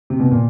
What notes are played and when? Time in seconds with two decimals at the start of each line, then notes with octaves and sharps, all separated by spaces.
0.10 C3
0.20 B2
0.31 A#2